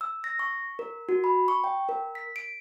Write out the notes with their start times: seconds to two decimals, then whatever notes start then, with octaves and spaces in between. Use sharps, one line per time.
0.01 E6
0.24 A#6
0.39 C#6
0.79 A#4
1.09 F#4
1.24 B5
1.48 C#6
1.64 G5
1.89 A#4
2.15 B6
2.36 D7